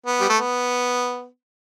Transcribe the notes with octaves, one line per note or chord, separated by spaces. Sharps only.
B3
G3
A3
B3